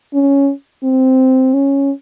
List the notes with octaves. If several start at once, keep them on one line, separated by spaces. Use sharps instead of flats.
C#4
C4
C#4